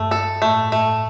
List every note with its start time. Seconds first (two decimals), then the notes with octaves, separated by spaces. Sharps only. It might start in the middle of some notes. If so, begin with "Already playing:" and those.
Already playing: G2 A3
0.11 A4
0.42 A2 A3
0.72 A3